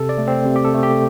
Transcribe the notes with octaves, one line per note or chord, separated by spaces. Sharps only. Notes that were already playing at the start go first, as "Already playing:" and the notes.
Already playing: C3 A4
D5
A3
C4
C3
G4
A4
A3
G4